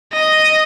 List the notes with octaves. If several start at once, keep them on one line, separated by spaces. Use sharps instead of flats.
D#5